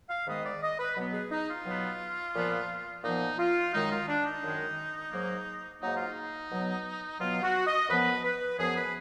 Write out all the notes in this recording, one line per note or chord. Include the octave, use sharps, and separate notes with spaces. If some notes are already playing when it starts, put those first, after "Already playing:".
F5
G#2 D#3 G#3 B3 D#5
D5
D#5
B4
B2 F#3 B3
G#4
D#4
F4
B2 F#3 B3
A#2 F3 B3
A#2 F3 B3 D#4
F4
F#2 D#3 G#3 D#4
F4
D4
D#4
F#2 D#3 G#3
G#2 F#3 A#3
G#2 F#3 A#3 D#4
F4
D#4
B2 F#3 B3
B2 F#3 B3 F4
F#4
D#5
F#2 F3 B3 B4
B4
F#2 F3 B3 G#4
B4